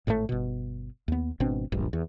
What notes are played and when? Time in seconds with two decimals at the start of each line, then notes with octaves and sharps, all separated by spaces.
0.07 G#1 A2 D3 A3
0.29 G1 B2
1.08 D#2 B3
1.40 G#1 B2 C4 D4
1.72 D1 A#1 G2
1.93 E2